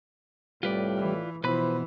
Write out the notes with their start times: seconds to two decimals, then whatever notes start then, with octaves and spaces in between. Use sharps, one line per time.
0.63 C2 A2 G3 F4 B4 D5
0.97 E3
1.44 B2 E3 F3 E4 B4 C5 B5